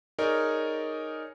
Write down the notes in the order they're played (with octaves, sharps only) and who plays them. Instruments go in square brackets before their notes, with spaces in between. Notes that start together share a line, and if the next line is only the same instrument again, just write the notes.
[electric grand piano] D#4 G#4 A#4 C#5 D5